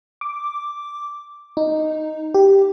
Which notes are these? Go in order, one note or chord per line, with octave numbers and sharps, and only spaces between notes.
D6
D#4
G4